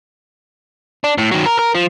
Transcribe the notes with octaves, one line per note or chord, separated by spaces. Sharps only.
D4
A2
D#3 F#3
A#4
A#4
F3